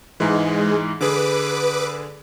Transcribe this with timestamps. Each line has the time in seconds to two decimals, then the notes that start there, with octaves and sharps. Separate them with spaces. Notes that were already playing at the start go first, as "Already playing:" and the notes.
0.20 G#2 E3 G#3
1.01 D3 G#4 B4 D6